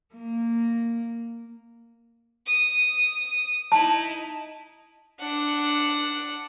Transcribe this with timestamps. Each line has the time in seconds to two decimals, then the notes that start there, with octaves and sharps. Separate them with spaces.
0.15 A#3
2.46 D#6
3.72 D#4 E4 A5
5.20 D4 F#5